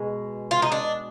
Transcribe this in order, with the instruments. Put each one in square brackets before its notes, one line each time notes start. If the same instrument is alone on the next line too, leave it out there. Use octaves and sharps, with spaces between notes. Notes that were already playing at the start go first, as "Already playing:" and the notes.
Already playing: [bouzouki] B2 G#3
F4
D#4
D4